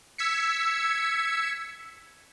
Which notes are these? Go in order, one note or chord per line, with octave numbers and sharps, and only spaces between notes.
E6 G#6 B6 C#7